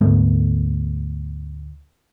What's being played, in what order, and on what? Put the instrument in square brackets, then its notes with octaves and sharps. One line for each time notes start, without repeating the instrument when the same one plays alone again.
[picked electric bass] D2 G#2 A3 B3